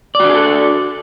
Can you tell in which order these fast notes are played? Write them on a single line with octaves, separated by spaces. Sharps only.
D5 F#4 D4 G#4 A4